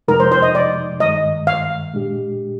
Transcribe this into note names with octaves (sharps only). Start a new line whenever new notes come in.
F2 C3 F3 G#3 D#4 A#4
C5
C5
D#5
D5
G2 D#3 G#3 D#5
F5
A#2 G#3 D4 G4